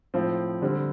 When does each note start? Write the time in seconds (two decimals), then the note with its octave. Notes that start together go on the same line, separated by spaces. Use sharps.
0.14 A2 F3 C4
0.62 D3 G3 C4